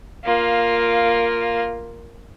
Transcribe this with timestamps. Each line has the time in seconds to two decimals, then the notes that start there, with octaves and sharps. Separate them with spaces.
0.25 A#3 F4